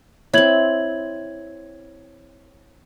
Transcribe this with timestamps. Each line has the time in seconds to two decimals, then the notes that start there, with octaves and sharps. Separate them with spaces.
0.34 C4 E4 C#5 G#6 F#7